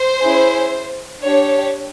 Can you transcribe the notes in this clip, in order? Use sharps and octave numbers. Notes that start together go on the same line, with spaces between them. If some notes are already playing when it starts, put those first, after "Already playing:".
Already playing: C5
C#4 E4 G#4
D4 G4 C#5